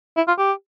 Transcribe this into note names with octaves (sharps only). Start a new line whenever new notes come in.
E4
F4
G4